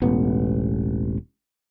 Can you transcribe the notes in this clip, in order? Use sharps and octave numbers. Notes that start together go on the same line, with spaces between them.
E1 A1 B3